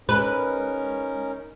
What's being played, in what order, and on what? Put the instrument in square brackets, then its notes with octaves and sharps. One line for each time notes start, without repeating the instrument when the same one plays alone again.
[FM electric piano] G#3 [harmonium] C#4 D#4 A#4 [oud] B4